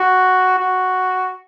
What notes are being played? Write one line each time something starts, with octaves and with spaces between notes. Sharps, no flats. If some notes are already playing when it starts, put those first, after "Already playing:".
Already playing: F#4
F#4